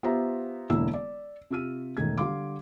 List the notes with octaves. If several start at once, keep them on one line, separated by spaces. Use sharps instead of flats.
B3 F4 G4 C5 E5 A#5
E1 D3 A#3 E4 E6
D5
C3 F4 G4 E6 F6 D#7
E1 D#3 A3 G#6
D3 G3 F5 C6 D6